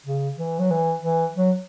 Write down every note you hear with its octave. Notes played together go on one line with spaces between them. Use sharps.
C#3
E3
F#3
E3
E3
F#3